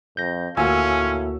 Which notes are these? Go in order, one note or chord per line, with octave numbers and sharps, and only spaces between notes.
F2 G6 A#6
D2 A2 A#3 C#4 F4 F#4 G#5 E6